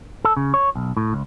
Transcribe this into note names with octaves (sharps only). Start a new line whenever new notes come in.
A4
C#3
C#5
B1
A2
C#2